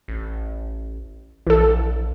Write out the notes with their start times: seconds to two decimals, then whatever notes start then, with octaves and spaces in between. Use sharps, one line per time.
0.08 A1
1.47 A#1 E3 A4